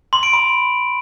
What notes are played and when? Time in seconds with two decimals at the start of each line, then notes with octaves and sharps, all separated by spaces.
0.13 C6
0.23 D7
0.33 B5